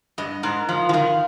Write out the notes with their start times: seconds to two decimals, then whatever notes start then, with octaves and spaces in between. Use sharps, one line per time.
0.18 G2 D#5
0.43 G#2 A#4
0.69 F3 F5
0.89 F3
0.93 D#3 F5